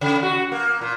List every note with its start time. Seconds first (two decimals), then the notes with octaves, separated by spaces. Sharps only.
0.01 C#3
0.22 F#4
0.52 A#3
0.81 A#2